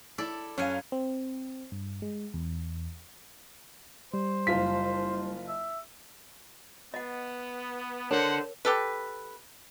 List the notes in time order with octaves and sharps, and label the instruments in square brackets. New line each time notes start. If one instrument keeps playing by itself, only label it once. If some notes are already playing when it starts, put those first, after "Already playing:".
[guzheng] E4 A4 D5
[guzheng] F#2 F#5 G#5 [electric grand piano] C#4 F5
[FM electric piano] C4
G2
G#3
E2
[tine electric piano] G3 [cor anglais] C5
[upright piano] F#1 F4 B6
[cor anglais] E5
[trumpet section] B3 [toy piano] D#5 F#5
[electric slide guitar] D4 A4 [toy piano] A#4 C#5 [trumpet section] C5 F#5
[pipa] G4 A4 B4